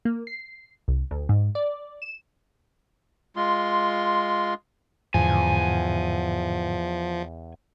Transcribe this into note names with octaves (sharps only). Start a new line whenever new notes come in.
A#3
C7
C2
D2
G#2
D5
E7
G#3 F4 C6
E2 G#2 D3 F3 G#5